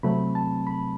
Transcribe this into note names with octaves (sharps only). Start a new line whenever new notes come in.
C3 F#3 A3 C4 B5
A5
B5